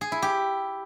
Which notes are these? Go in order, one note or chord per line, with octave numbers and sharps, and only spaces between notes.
G#4
E4
G4